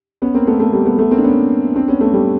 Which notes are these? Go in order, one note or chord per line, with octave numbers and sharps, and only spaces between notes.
B3 C#4
A#3 C4
A3 B3
A3 B3
G3 A3
A3 B3
A3 B3
A#3 C4
D4
B3 C#4
C4 D4
B3 C#4
A3 B3
G3 A3